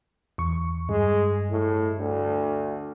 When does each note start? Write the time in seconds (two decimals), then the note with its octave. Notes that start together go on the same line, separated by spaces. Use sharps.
0.38 E2 C#6
0.89 G2 G#3
1.50 A2
1.97 D2